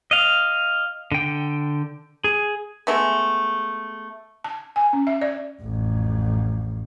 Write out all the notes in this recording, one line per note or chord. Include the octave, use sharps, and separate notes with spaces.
D#5 F5
D3 G5
G#4
G#3 A3 B3
A5
G#5
C#4
E5
D5
A1 F2